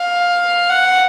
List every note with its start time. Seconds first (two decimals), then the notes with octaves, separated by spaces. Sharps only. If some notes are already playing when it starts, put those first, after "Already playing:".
Already playing: F5
0.69 F#5